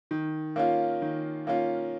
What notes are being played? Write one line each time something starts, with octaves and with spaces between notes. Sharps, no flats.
D#3
A#3 C#4 F4
D#3
A#3 C#4 F4